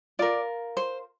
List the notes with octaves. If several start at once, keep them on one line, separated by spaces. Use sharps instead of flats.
F4 A#4 D5
C5